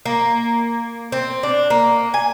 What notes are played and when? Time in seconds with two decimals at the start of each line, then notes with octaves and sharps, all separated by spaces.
0.06 A#3
1.12 C4
1.43 D4
1.70 A#3
2.14 G#5